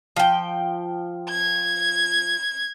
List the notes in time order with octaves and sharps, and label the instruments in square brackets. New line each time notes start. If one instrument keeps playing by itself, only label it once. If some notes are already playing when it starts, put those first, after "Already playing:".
[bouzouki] F3 G5
[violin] G#6